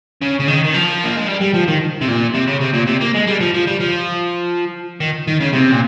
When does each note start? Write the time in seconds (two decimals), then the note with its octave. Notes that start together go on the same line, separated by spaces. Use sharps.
0.21 C#3
0.40 C#3
0.48 D#3
0.65 D#3
0.74 F3
1.04 A#3
1.16 G#3
1.28 G3
1.41 G3
1.54 F3
1.68 D#3
2.01 C3
2.08 A#2
2.34 C3
2.47 C#3
2.61 C3
2.74 A#2
2.87 C3
3.01 A#3
3.15 G#3
3.27 G3
3.41 F3
3.54 F3
3.67 G3
3.80 F3
5.00 D#3
5.27 D#3
5.41 C#3
5.53 C3
5.72 A#2